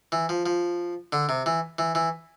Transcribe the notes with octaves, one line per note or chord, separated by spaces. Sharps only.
E3
F3
F3
D3
C3
E3
E3
E3